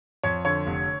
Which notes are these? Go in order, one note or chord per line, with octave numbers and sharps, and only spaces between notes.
F2 C#5
D3 C#5
F1